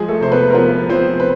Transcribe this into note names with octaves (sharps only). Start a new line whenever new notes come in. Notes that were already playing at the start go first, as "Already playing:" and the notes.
Already playing: F3 G#3 G#4
A3 A4
C3 C5
B3 B4
A#4
F3 B3 B4
F3 C4 C5
B4